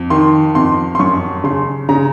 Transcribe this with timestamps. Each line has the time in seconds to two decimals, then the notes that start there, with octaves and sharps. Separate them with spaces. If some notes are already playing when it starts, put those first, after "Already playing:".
Already playing: F2
0.10 D#3 C6
0.55 F2 C6
0.95 C6
0.99 F#2 C#6
1.44 C#3 C6
1.89 C#3 A#5